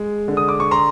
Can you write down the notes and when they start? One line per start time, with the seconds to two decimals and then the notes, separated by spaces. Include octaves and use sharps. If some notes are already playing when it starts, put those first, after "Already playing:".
Already playing: G#3
0.28 D3
0.37 D#6
0.49 D6
0.60 C#6
0.71 A#5 C6